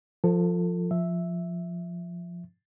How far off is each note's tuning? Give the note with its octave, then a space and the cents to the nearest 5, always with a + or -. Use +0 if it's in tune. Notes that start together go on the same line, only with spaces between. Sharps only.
F3 +5 F4 +0 A4 +30
F3 +0 E5 +0